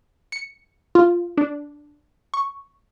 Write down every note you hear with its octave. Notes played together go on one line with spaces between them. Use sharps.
C#7
F4
D4
C#6